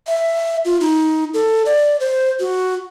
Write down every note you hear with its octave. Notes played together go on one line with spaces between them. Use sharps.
E5
F4
D#4
A4
D5
C5
F#4